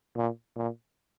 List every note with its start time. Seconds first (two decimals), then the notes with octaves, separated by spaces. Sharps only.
0.16 A#2
0.56 A#2